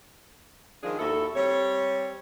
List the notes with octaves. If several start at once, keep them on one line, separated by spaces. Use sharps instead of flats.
D#3 F3 G#3 D4 G#4
D#2 E4 F#4 A4
G3 C4 C#5